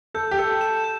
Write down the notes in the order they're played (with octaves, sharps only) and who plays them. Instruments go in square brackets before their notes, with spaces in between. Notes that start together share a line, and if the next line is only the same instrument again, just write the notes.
[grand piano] A4 [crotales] G6
[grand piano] G4
[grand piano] A4 [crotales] G6
[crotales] E7
G6